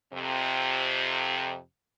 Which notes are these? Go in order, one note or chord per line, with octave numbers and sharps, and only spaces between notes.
F2 C3